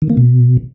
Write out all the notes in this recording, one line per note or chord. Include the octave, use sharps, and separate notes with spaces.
D#3
A#3
B2